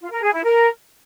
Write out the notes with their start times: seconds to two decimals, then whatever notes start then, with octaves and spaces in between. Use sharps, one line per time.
0.01 F4
0.11 A#4
0.22 G#4
0.33 E4
0.44 A#4